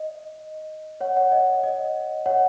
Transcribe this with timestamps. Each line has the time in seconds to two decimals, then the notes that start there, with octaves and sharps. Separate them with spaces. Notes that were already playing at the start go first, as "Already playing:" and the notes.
Already playing: D#5
1.01 C#5 F#5
1.17 C#5 F#5
1.32 D#5
1.63 D#5
2.26 C#5 F#5